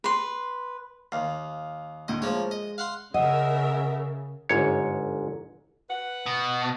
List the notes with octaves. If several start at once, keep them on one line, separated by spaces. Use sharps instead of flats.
B4 C6
D#2 F5
D2 A2 D#5
F3 G#3 A#3 C#5
D#5
F5 F#5 C6
C#3 A#4 D#5 E5 F#5
G1 G#2 C#5
B4 F#5
B2